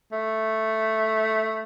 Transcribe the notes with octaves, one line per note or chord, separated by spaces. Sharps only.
A3